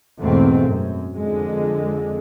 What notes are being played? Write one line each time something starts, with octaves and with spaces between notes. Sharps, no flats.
E2 G#2 B2 A3 C4
F#2
F2 D3 G#3